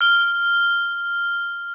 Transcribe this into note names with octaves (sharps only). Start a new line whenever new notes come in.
F6 G7